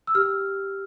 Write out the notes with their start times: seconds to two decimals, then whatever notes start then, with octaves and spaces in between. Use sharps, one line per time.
0.07 E6
0.15 G4 F6